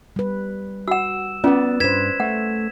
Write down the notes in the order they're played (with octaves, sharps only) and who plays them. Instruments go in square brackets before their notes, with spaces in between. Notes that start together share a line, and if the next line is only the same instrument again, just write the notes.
[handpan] G3 B4
[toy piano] F#4 F#5 [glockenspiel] E6 E7
[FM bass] B3 [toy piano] C#4 F4 [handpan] B4 D5
[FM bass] G2 [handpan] B4 C5 [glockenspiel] G#6 B6 E7
[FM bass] A3 [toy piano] F#5